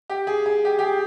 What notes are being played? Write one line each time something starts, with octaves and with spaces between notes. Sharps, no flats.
G4
G#4
G#4
G4
G4
G#4